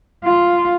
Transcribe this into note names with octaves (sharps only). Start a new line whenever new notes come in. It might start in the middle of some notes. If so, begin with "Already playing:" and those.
F4